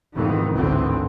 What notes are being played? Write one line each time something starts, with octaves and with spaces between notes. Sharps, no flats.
F1 F2 G#2 D#3 E3
G#1 D2 A2 D3 E3 C4